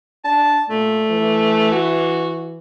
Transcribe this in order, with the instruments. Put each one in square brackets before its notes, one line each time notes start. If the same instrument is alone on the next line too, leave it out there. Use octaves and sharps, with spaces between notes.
[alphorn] D4 [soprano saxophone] A5
[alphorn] A#2 [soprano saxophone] A3
[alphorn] E3
[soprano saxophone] F#4